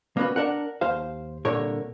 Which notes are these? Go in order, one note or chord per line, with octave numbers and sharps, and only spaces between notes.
A#3 B3 C#4 F#4
D4 A#4 F#5
D#2 C5 F5
C2 A#2 D3 A#4 C#5